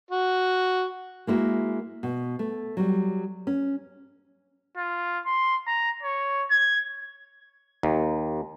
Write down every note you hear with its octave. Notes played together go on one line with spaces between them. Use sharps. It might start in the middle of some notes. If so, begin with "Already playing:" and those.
F#4
G#3 A#3 E4 F#4
B2
A3
F#3 G3
C#4
F4
C6
A#5
C#5
G#6
D#2